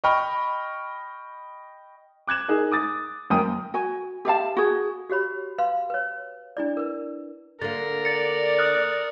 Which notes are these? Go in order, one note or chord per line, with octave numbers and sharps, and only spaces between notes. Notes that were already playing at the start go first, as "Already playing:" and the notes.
D#5 G5 B5 C#6 F6
D6 F#6 G#6 E7
D#4 G#4 A#4
D6 D#6 A6
F#2 A#3 G5 D#6 D#7
F#4 G#5
G4 E5 F5 A5
F#4 G#4
F#4 G4 C#5 B5
B4 F5 C6
B4 C#5
D4 E4 D5
A#4 B4
D3 A#3 A#4 A6
D5 A6 C#7
D#6 F6 F#6